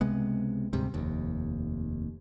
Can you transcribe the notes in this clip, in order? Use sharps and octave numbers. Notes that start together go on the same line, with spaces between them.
C#2 C3 G#3 B3
D2 G#2 C3 G3
F1 D#2